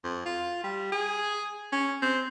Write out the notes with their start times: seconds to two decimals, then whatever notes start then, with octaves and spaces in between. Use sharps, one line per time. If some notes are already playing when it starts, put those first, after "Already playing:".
0.04 F2
0.26 F4
0.64 G3
0.92 G#4
1.72 C#4
2.02 C4